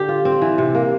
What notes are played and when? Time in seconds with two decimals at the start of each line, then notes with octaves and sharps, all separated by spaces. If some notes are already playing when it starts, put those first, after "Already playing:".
Already playing: D3 D4 G4
0.09 F4
0.25 C4
0.42 E3
0.58 C3
0.75 A#3